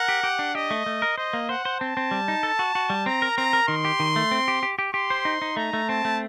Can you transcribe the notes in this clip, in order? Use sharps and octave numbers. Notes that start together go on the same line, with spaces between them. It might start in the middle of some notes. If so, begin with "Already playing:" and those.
Already playing: A#4 F#5
G4
G4
D4
G4 D#5
A3
A3
A#4
C5 D#5
A#3
C5 F#5
C5
C4 A5
C4
G3
D#4
A4
F#4
F#4
G3
C4 A#5
A#4
C4 A#5
A#4
D#3 C6
G4
D#3
A3
C4
G4
G4
G4
G4 C6
C5
D#4
D#4
A3 A#5
A3
C4 A5
A3